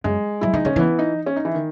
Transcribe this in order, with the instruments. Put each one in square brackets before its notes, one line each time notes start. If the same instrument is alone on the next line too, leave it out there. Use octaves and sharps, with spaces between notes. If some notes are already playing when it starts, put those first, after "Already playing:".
[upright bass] F#2 [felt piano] G#3
[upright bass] F#3 [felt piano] E4
[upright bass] E3 [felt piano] D#4
[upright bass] D#3 [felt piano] C#4
[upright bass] E3 [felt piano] B3
[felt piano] D#4
C#4
D#4
E3
D#3